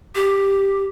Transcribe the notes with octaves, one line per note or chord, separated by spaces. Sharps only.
G4